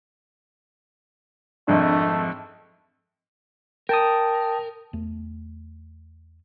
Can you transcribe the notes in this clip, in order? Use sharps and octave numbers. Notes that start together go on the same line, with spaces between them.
G#1 F2 G#2 A3 D4
A#4 G5 A5 D#6
E2 A3